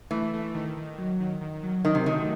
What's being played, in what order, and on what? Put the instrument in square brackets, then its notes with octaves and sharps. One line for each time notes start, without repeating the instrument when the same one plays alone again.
[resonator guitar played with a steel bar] E3 [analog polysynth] A3
[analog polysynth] A3
D#3
D#3
F#3
D#3
D#3
F#3
[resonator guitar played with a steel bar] D#3 [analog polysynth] F#3
[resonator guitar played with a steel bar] C3
[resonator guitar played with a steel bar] D#3 [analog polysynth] A3